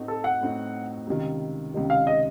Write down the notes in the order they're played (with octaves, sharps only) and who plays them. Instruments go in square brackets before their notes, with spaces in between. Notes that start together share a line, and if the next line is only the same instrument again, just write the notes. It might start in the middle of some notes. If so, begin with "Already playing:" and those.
Already playing: [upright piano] A2 A3 C4 D#4 F#4
[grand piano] A4
F#5
[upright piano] A2 A3 C4 D#4 F#4
C#2 C3 D#3
C#2 C3 D#3
[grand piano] F5
D#5